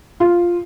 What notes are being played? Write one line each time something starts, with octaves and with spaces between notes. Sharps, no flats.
F4